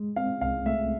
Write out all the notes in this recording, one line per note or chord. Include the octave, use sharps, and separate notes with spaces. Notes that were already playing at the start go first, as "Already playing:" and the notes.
Already playing: G#3
C4 F5
C2 F5
A3 E5